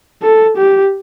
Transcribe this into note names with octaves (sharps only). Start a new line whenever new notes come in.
A4
G4